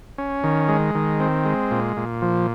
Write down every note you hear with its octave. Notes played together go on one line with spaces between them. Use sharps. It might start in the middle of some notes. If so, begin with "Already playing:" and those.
C#4
D#3
G#3
D#3
C4
G#3
A#2
A#2
F3